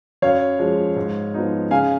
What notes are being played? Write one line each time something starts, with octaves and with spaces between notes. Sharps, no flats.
F#2 C#5 F5
F3 G#3
G#2
F3 B3 D#4
C#3 F5 G#5